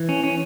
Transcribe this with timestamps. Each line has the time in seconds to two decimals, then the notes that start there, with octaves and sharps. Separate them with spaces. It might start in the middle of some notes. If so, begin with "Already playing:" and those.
Already playing: E3
0.09 C#4
0.24 C#4